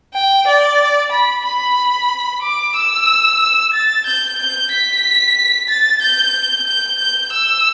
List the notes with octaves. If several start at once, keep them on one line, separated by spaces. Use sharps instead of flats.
G5
D5
B5
B5
D6
E6
A6
G6
G6
B6
A6
G6
G6
G6
E6